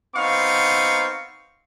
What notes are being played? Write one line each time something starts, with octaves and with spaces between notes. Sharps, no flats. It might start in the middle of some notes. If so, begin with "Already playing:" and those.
B3 C4 D#4 F5 C#6